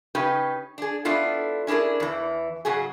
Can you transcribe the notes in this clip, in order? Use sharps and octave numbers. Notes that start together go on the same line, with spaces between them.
C#3 C#4 D#4 G4 B4
D4 G#4
B3 D4 E4 F4 A4
C#4 D4 E4 G#4 A#4
E2 E3
G#2 C#3 F#3 F#4 G#4